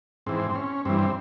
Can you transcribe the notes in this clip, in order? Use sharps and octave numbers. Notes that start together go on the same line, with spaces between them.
G#2 E3 C4
C4
C#4
G2 E3 C4
C4